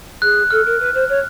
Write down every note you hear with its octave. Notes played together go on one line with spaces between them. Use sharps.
G#4 F#6
A4 F6
A#4
B4
C5
C#5